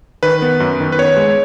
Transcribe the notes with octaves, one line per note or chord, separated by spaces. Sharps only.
D#3 B4
B3
F#2
D#3
B4
B3 C#5
G#3